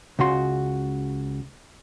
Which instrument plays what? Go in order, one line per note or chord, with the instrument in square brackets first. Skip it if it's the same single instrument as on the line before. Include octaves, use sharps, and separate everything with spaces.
[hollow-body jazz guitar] C#2 C#3 F#4 C6